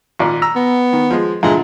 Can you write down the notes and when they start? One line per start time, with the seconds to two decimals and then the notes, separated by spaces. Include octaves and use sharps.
0.19 G#1 A#2 D5
0.42 A#5 E6
0.56 B3
0.93 D#3
1.10 F3 G#3
1.43 E2 A#2 D3 G#3